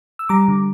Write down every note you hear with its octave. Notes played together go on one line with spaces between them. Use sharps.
E6
G3 A#5 D6
D3